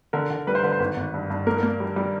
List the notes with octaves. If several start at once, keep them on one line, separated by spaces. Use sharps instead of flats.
D3 A#4
D3
G3 B4
C5
D3 B4
C5
G#1 B4
G#1
G2
G2
A#3 A#4
A#4
A#3
G3
G3